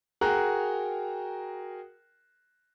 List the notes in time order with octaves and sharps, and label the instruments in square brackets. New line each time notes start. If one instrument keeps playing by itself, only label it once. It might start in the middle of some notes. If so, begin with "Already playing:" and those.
[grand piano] F#4 G#4 A#4 G5 A#5 F#6